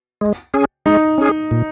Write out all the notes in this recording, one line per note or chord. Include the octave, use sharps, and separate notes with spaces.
G#3
C#4 G#4
G#3 D#4
C#4 G#4
A#2